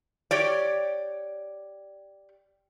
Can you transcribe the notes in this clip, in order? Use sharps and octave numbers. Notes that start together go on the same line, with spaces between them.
G4 C#5 D5